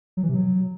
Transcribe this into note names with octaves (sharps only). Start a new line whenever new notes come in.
F#3
E3
C3
F#3